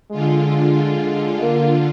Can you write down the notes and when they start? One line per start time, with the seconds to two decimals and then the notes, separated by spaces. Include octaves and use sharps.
0.11 D3 G#3 F4
1.42 A#3